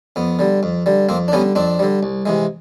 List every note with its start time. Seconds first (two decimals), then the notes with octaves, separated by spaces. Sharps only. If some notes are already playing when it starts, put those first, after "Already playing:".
0.16 F2 B3
0.39 D3 G3
0.63 F2
0.86 D3 G3
1.09 F2 A#3 C4
1.28 D4
1.32 D3 G3 B3 C#4
1.55 F2 C4 D4
1.79 D3 G3
2.03 C2
2.26 C3 E3 G#3